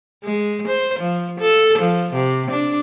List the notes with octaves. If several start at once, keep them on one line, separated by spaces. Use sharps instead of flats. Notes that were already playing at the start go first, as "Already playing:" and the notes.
G#3
C5
F3
A4
F3
C3
D4